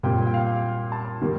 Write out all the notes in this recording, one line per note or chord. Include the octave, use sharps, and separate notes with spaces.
A#2 G3 C4 G5
G5
F5
A5
D#3 G3 A#3